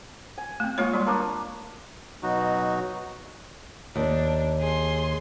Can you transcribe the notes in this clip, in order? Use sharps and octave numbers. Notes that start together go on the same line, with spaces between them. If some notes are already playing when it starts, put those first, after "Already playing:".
G#5
A3 C4
G#3 A#3 F4 C#5 C#6 D#6
G3 C6 C#6
A#3 D4 D#6
B2 F#3 D#4 F#4
D#2 D4
G#4 C6